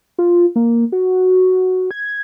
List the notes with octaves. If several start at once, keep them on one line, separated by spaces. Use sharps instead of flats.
F4
A#3
F#4
G#6